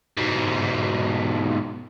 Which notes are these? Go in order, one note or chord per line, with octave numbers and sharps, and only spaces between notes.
G#2 B2